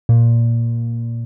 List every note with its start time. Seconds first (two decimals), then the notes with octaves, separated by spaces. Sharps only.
0.09 A#2